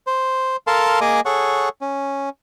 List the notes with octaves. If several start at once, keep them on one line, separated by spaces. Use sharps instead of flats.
C5
A4 A#4 F5 A5 C6
A#3 G#4 D#5 G#5 D6
G#4 A4 C#5 F#5 C#6
C#4